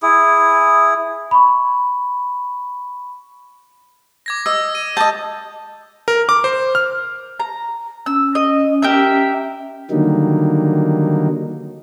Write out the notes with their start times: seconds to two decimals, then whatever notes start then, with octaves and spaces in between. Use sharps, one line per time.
0.02 E4 G#4
1.31 B5 C#6
4.26 D6 G#6 A#6
4.46 D#5 E6
4.75 D#7
4.97 D#5 A5 G6
6.08 A#4
6.29 D6
6.44 C5
6.75 F6
7.40 A#5
8.06 C#4 E6
8.35 D#5
8.82 G4 A#4 E5
9.91 D3 D#3 F#3 G3 A#3 D#4